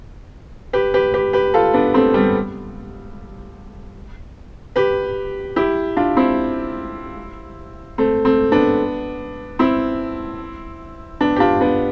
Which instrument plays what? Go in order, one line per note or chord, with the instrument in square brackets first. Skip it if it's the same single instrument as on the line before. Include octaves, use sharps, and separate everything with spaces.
[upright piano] G4 B4
G4 B4
G4 B4
G4 B4
F4 A4
B3 D4
A3 C4
G3 B3
G4 B4
E4 G4
D4 F4
C4 E4
A3 C4
A3 C4
B3 D4
C4 E4
B3 D4
G4
D4 F4
B3 D4